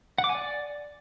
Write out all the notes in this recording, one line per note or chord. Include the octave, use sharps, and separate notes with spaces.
F#5
D6
G#5
D5